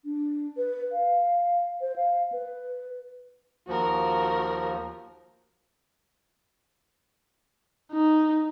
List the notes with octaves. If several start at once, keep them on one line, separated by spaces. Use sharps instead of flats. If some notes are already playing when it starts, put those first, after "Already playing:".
D4
B4
F5
C5
F5
B4
D#2 F3 F#4 A#4
D#4